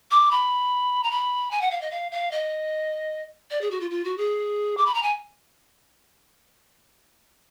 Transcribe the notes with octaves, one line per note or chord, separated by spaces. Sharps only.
D6
B5
A#5
B5
G#5
F#5
F5
D#5
F5
F5
D#5
D5
G#4
F#4
F4
F4
F#4
G#4
D6
B5
A#5
G#5